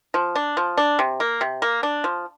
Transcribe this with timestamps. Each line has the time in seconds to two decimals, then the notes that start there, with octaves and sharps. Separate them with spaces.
0.14 F3
0.35 D4
0.57 F3
0.77 D4
0.99 C3
1.20 A#3
1.41 C3
1.62 A#3
1.83 D4
2.04 F3